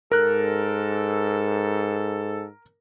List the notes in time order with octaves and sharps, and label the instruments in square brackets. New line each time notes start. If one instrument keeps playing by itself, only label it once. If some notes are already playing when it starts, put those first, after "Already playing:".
[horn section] G#2 A4 [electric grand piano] A#4 F#6